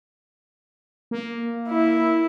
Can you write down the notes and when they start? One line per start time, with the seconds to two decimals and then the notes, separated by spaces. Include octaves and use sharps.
1.11 A#3
1.69 E4